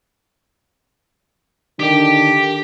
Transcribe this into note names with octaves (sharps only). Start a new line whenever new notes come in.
D3 D#3 D4 G4 G5